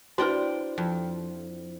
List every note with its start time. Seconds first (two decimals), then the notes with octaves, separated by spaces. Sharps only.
0.18 D4 E4 F#4 B4 C5 G5 A#5
0.78 F2